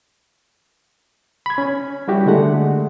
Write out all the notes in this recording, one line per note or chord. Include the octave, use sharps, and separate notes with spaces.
B5 G#6
C#4
G3 E4 F#4 G4
D3 G#3 A3 F#5